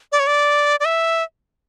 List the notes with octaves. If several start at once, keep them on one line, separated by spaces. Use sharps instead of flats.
D5
C#5
D5
D5
E5